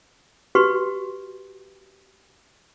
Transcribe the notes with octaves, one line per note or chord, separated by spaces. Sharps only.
F#4 G4 B4 C6 C#6